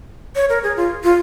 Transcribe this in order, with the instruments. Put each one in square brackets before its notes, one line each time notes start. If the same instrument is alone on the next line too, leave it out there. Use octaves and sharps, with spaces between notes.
[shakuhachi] C#5
A#4
G#4
F4
F4